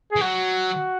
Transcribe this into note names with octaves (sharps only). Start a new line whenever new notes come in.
G#4
E3
F#3 F#4